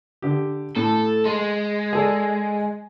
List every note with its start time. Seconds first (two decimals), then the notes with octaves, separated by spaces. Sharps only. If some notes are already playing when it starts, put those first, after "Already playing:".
0.22 D3 G4
0.76 A2 A4
1.25 G#3 C6
1.93 G#4 A4 D5